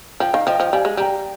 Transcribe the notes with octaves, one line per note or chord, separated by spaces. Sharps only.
F3 G5
D#3 F5
F3 D#5 G5
F3
G5
G3 F5 G#5
G#3
G3 G5 A#5